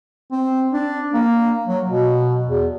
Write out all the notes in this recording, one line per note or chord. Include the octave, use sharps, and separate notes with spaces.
C4
D4
A#3
F#3
B2
E2